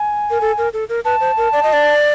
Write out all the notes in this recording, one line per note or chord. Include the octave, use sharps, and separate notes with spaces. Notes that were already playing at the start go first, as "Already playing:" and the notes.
Already playing: G#5
A#4
A4
A#4
A4
A#4
B4 A5
C5
A#4
D5
D#5
D5